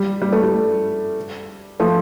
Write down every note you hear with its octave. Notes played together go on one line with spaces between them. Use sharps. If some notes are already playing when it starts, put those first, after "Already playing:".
Already playing: G3
G3
A3
G3
F3 A3